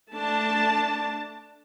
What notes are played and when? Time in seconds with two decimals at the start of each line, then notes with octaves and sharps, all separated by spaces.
0.11 A3 D4 A5